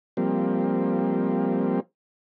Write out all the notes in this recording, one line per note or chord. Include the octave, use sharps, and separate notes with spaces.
F3 G3 A#3 C4